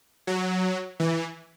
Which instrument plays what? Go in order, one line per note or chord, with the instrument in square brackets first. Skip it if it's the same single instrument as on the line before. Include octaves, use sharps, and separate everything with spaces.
[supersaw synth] F#3
E3